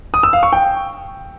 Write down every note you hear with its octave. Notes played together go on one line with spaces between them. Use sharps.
D#6
E6
F5
C#6
G5